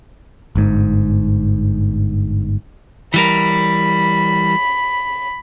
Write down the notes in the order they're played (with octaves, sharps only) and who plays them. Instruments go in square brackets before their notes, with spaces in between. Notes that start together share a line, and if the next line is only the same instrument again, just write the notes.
[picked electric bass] G1 G#2
[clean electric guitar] E3 G3 A#4 [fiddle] B5